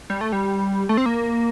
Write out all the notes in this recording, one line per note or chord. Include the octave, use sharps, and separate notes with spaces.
G3
A3
G3
A3
C4
A#3